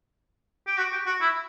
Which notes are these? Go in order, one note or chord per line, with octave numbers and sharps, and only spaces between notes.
G4
F#4
G4
F#4
E4